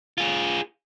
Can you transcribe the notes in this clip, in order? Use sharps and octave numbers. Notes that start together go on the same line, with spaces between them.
F4 G#4